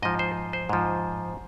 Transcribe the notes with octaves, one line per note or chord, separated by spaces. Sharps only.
G#2 F3 D#5
C5
C5
G#2 F3